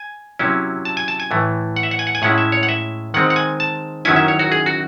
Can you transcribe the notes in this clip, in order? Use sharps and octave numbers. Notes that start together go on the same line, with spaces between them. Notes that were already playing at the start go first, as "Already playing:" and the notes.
Already playing: G#5
C3 F#3 C#4 E4
A5
G#5
A5
G#5
A2 E3 A3
F#5
E5
F#5
G#5
F#5
G#5
A2 G#3 C#4 E4 F#5
E5
C#5
F#5
E5
D#3 G#3 C4 F#5
F#5
G#5
A5
F#2 D#3 F#3 C#4 E4 G#5
E5
C#5
F#4
G#4
F#4